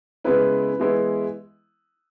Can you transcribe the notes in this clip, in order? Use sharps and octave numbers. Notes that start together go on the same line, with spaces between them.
C#3 G#3 B3 E4 B4
E3 G#3 B3 E4